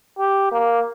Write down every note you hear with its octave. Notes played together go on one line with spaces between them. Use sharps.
G4
A#3